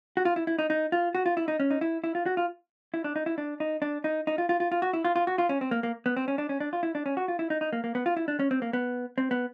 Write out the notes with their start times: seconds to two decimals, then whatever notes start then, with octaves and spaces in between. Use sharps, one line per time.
0.17 F#4
0.25 F4
0.36 E4
0.47 E4
0.59 D#4
0.70 D#4
0.92 F4
1.15 F#4
1.26 F4
1.37 E4
1.48 D#4
1.60 C#4
1.71 D#4
1.81 E4
2.04 E4
2.15 F4
2.26 F#4
2.37 F4
2.94 E4
3.04 D4
3.16 D#4
3.26 E4
3.38 D4
3.60 D#4
3.82 D4
4.04 D#4
4.27 D#4
4.38 F4
4.49 F4
4.60 F4
4.72 F4
4.82 F#4
4.93 E4
5.05 F4
5.16 F4
5.27 F#4
5.38 F4
5.49 C#4
5.61 C4
5.71 A#3
5.83 A#3
6.06 B3
6.17 C4
6.28 C#4
6.38 D4
6.49 C#4
6.60 D4
6.73 F4
6.83 E4
6.95 D4
7.06 C#4
7.17 F#4
7.28 F4
7.39 E4
7.50 D#4
7.61 D#4
7.73 A#3
7.84 A#3
7.95 B3
8.06 F4
8.17 E4
8.28 D4
8.39 C#4
8.51 C4
8.62 A#3
8.73 B3
9.18 C4
9.31 B3